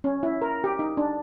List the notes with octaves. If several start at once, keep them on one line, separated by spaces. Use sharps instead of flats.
C#4
E4
A#4
G4
D#4
D4